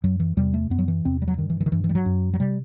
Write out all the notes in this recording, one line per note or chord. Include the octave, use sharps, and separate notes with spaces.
F#2 F#3
E3
E2 C3 G3
A3
F#2 B3
F#3
E3
E2 C3 C4
G3
F#3
G2 D#3
E3
E3
D#3
G2 E3
E3
G3
F#3
F#2
F#3
C3 G3